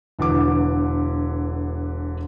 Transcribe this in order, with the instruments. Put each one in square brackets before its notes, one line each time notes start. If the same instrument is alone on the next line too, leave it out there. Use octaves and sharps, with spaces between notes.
[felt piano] E1 D3 E3 D6